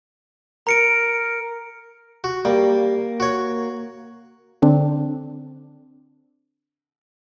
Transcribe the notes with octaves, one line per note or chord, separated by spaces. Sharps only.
A#4 A#5 C#7 D7
F#4
G3 A#3
F#4 C#5
D3 C4 D4